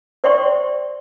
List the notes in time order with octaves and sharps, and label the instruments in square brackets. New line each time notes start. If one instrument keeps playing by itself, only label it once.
[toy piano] C5 D5 E5 G5 C6 C#6